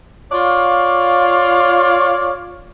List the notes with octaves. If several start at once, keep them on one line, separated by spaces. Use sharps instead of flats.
F4 C#5 D5 F5